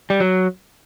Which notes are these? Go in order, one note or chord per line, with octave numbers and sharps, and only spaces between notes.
G3
F#3